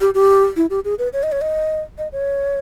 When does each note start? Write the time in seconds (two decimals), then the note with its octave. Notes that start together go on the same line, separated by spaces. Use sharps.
0.01 G4
0.14 G4
0.57 E4
0.70 G4
0.85 G#4
0.99 B4
1.13 C#5
1.23 D#5
1.32 C#5
1.41 D#5
1.98 D#5
2.12 C#5